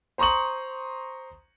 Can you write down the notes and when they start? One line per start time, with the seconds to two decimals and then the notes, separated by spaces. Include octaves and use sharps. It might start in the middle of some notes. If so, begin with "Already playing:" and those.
0.18 C5 A#5 C6 C#6 D#6 F#7